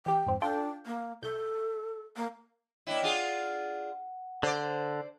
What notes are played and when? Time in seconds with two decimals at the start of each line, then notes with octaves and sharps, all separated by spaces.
0.06 E3 G4 G5
0.26 F2 G#2 C4
0.42 D4 F4 A4 G5
0.86 A#3
1.22 C2 A4 G6
2.16 A#3
2.87 A#3 D4 E4 C#5 D#5 G5
3.02 D4 F4 G#4 F#5
4.43 D3 C5 D5